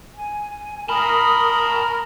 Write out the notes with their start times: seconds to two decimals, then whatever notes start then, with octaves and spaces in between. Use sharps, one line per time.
0.15 G#5
0.89 A#4 A5 B5 D#6